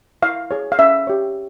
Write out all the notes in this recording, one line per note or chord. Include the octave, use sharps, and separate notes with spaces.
E4 F5
G#4 C#5
F5
C#4 E5
G4 C#5